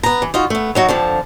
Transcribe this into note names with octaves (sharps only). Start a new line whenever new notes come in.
B3 A#5
E3
D#4 F4 F#4
A3 B3
F#3 D#4 F#4
F2 D3 F3 A5